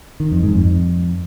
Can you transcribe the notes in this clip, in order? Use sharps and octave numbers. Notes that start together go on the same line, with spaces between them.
D#3
F2
G#2
F2